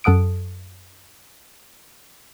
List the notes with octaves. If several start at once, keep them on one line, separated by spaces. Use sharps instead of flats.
F#2 A4 F#5 D#6 D7